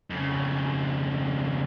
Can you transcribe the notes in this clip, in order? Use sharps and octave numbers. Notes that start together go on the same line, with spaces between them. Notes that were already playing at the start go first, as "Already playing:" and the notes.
F2 C#3